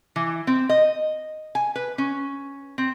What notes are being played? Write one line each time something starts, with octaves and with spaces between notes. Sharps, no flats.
E3
C4
D#5
G#5
B4
C#4
C4